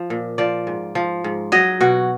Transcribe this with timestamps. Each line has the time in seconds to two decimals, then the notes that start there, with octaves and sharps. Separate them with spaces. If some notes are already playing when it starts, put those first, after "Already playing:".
Already playing: F3
0.10 A#2
0.38 F3 D5
0.67 G#2
0.95 F3
1.24 G#2
1.52 F#3 D#5
1.81 B2 F#4